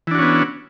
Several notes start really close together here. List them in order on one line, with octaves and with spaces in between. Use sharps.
E3 D4 F#4 C#4 B3